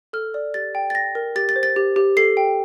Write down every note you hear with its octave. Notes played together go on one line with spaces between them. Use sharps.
A4 F6
D5
G4 A6
G5
A6
G5 A#6
A#4
G4 A6
A6
C5
A6
G4
G4
A4 C7
G5